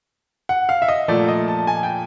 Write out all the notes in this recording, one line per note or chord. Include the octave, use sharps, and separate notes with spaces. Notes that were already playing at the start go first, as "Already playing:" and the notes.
F#5
F5
E5
D#5
A#2 F3 A3 D5
D#5
A5
G#5
G5